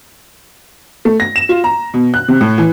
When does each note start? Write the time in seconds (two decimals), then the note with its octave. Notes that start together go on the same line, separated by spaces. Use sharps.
1.05 A3
1.20 A#6
1.36 E7
1.49 F4
1.64 A#5
1.94 B2
2.14 F#6
2.28 C3
2.41 A2
2.58 E3